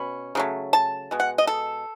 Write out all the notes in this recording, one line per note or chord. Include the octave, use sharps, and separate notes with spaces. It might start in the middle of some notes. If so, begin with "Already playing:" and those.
Already playing: B2 C#4 B5
C#3 F#3 A3
A5
B2 G#3
F#5
D#5
A4